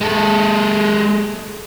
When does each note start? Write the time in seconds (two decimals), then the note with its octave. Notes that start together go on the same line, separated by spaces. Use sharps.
0.01 G#3 A4